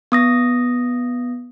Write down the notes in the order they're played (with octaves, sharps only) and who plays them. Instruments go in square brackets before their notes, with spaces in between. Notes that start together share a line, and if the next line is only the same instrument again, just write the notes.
[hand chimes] B3 D#6 A#6